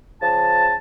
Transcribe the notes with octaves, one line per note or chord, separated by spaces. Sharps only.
C#3 F3 A5